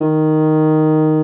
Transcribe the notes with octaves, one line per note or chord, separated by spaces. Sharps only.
D#3